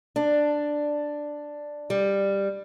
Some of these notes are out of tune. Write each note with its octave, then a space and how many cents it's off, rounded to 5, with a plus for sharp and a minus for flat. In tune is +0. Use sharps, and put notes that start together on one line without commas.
D4 +5
G3 +10